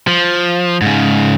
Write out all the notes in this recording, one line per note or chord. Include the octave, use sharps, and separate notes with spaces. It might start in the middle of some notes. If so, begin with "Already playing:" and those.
F3
G#2 C#3